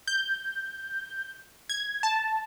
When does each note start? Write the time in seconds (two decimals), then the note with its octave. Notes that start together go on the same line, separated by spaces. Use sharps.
0.07 G6
1.69 G#6
2.03 A5